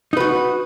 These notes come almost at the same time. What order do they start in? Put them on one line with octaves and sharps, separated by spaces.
D#4 B4 F#4